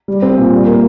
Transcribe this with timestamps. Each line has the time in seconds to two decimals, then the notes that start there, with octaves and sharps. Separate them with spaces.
0.08 G3
0.22 C4
0.37 A#2
0.51 G3
0.66 A#3